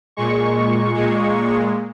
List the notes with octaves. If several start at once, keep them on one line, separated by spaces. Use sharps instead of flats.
A#2 G#3 C#6
A#2 G#3